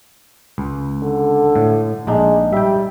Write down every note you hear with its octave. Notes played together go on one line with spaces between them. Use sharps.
C#2
D3
A2
A#1 G#3 D4 D#4
G3 E5 G5